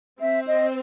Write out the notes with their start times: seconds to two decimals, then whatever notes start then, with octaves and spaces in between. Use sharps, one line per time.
0.20 C4 E5
0.47 D#5